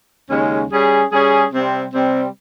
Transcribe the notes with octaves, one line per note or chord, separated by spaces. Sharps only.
D#2 C#3 G#3 C#4
G3 C#4 G#4
G3 C#4 G#4
C3 G3 C4
C3 G3 C4